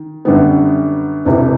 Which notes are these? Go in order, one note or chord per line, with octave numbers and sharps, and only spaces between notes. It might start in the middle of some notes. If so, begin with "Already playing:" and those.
Already playing: D#3
F#2 D3 G3 B3
E1 E2 C3 E3